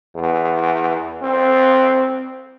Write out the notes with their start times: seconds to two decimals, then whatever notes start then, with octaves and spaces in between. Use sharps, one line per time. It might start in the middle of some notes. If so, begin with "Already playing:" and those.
0.15 E2
1.22 C4